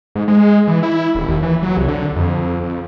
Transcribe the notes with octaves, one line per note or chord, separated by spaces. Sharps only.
G#2
G#3
E3
E4
D#1
D#2
E3
F#3
C2
D3
F2
F2